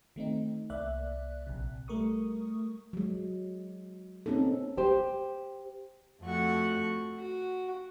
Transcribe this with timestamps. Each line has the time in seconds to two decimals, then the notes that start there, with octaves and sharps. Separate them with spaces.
0.16 D#3 A3 C4 D#4
0.70 C2 A#3 D5 E5 F#6
1.47 A#1 C3
1.88 G3 A3 A#4 C#6 D#6
2.93 F#3 G#3
4.26 A#3 C4 C#4 D#4 A4
4.77 G4 C5
6.22 F2 A3 F#4 C#6
7.16 F#4